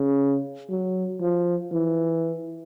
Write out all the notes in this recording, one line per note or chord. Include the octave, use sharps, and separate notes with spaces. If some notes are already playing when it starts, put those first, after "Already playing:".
Already playing: C#3
F#3
F3
E3